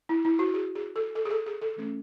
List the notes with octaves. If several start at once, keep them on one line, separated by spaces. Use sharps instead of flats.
E4
E4
F#4
G#4
G#4
A4
A4
G#4
A4
G#4
A4
E3 A3 C#4